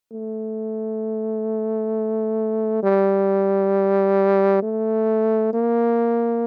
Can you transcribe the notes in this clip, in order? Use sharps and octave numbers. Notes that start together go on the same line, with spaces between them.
A3
G3
A3
A#3